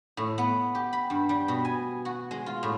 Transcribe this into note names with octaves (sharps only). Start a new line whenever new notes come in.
A2
B3
G4
B5
G2
G3
B2
G#5
F#4
G#3
F4
A2